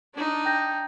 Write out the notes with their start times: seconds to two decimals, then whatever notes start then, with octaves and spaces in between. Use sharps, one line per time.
0.14 D4 D#4
0.45 G5 G6 A#6